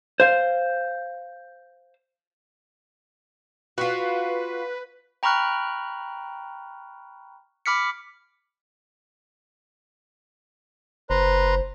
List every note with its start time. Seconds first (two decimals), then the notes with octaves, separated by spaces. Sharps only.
0.20 C5 F5
3.78 F4 F#4 B4
5.23 G5 A#5 B5 C#6 F6 F#6
7.66 B5 D6 F6 B6 C#7
11.10 F#1 B4 C5 A#5 C6